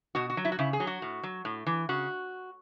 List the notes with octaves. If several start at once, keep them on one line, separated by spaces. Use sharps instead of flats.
B2 F#4
F#4
F#3
E4
F#4
C#3 E4
G#4
F#3
F#4
A2
F#3
A2
E3
C#3 F#4